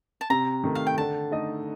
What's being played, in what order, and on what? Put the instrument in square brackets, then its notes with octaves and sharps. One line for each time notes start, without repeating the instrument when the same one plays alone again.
[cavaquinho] A5
[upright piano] C3 [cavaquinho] A#5
[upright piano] D#3 A3
[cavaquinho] F5
G5
[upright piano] D3 [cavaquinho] A5
[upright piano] A3 D#4 A4 D#5